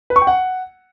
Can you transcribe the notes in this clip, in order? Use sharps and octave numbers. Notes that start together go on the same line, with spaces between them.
B4
C#6
G5
F#5